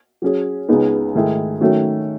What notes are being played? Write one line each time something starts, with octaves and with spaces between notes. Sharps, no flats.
F#3 C#4 G#4
C#2 C#3 G#3 B3 D#4
G#2 D#3 A3 E4 G#4
D#3 F#3 A3 C#4 F#4